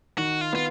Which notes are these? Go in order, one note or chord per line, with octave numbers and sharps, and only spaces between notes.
D#3 F#4
F4
B3 F4